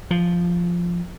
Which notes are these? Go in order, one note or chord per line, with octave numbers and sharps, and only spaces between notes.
F3